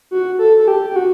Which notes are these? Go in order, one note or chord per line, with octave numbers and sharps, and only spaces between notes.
F#4
A4
A4
G4
G4
F#4